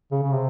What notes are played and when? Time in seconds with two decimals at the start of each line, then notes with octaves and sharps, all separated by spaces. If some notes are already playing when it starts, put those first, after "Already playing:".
0.11 C#3
0.22 C#3
0.33 C3